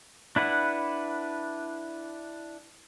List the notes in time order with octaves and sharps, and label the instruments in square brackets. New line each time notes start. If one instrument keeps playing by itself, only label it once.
[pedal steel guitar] D4 E4 B4 F#5